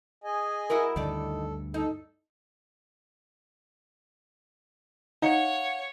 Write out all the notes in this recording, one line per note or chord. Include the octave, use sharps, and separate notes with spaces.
G#4 D#5 G#5
E4 F#4 A#4
D2 G2 D#3 A4 D5
D#4 A4
D#4 C#5 F5 F#5 C#7